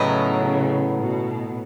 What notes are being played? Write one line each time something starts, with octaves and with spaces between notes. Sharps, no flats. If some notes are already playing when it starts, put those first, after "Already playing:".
Already playing: A2 C#3 F#3 B3 D#4
B2